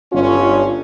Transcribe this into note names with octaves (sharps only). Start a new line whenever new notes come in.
G1 C#4 F4